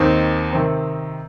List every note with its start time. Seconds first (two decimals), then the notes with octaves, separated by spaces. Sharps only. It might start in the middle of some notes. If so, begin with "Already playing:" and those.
Already playing: D#2 D#3 C4 D#4
0.53 C3 D#3 C4